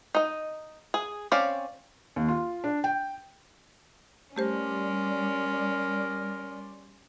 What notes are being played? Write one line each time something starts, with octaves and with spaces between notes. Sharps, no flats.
D#4 D#5
G#4
C4 C#4 D5 F5
D#2
F4
D4
G5
G3 A3 C#4 G4 A#4 C5 D5 C6